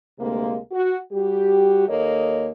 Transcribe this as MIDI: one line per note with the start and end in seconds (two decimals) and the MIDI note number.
0.19 0.57 38
0.19 0.57 48
0.19 0.57 56
0.19 0.57 58
0.72 0.97 66
1.13 1.86 55
1.13 1.86 66
1.13 1.86 67
1.88 2.50 39
1.88 2.50 58
1.88 2.50 69
1.88 2.50 73
1.88 2.50 75